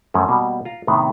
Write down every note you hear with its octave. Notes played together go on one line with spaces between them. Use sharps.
F#2 F3 A3 C#4
B2 G3 A#3
F4 A#5
A2 C3 D#3 B3